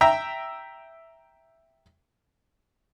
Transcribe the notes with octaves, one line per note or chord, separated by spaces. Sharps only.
E5 G5 A#5